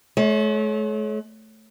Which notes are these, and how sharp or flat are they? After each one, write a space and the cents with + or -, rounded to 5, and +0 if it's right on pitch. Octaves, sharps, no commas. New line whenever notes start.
A3 -45 C#5 +0